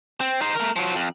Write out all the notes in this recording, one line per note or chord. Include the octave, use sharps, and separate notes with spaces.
C4
D#4 C5
A3 A#4
F3 F#3
F2